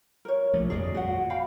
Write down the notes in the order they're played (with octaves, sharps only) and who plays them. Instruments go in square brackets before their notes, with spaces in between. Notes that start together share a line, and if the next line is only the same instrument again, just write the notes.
[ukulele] A#4 C#5
[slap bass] A#1 F3 A3
[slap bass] G1 F2 G3 [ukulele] G#4 D5 D#5
[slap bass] A#2 [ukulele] F#4 F#5
[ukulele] F5 G5 B5